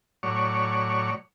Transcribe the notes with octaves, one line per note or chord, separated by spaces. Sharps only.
A2 F#3 C#5 D5 C#6